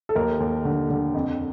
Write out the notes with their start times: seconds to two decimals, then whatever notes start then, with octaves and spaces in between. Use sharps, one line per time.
0.09 A4
0.15 D#2 A#4
0.40 D#2
0.65 D3
0.90 D3
1.14 F2